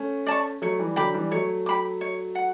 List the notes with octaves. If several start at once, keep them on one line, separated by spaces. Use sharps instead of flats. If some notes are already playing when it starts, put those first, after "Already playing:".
Already playing: A3 C#4
D5 A5 C#6
F#3 A3 C#5
E3 G3
D3 F#3 G5 B5 D6
E3 G3
F#3 A3 C#5
G5 B5 D6
C#5
F#5